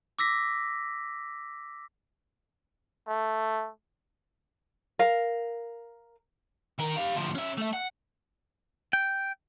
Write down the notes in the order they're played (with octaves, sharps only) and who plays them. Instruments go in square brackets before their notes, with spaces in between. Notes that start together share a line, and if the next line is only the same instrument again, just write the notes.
[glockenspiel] D6 E6 A#6 B6
[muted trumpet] A3
[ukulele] A#4 F5
[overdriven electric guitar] D#3 A#4
G4 F5
D2 F3
C#4 E5
A3 E5
F#5
[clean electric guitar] G5